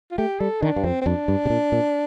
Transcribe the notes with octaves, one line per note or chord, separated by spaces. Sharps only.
F4
A3 G4
G3 A4
D#3 D4
G2
F2 C4
C4
F2 D4
G2
C3
A#2
A#2